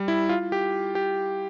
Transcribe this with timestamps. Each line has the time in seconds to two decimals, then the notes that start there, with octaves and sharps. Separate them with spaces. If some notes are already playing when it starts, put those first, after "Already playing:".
Already playing: G3
0.08 E4
0.29 F4
0.52 G4
0.95 G4